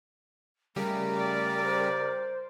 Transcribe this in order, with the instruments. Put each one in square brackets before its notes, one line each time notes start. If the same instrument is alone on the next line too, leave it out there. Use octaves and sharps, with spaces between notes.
[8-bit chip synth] C#3 G3 G4 [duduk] A3 [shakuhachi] A#4
[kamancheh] D5
[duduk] C5